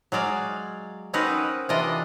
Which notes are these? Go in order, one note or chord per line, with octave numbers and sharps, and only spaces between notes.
F#3 G#3 D5 F5
C4 C#4 D#4 F#4 A#4 B4
C3 E3 D4 F4 D5 D#5